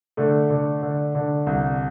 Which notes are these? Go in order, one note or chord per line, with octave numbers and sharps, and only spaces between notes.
D3 A3
D3
D3
D3
C2